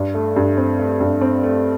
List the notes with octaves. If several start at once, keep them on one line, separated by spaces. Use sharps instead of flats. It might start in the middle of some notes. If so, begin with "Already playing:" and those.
Already playing: G2
A3
G2
C4
A3
G2
C4
A3